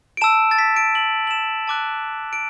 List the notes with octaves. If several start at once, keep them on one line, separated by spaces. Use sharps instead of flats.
D7
A5 E6 E7
A6
B6
D7
F#7
F#7
E7
A5 D6 F#6
D7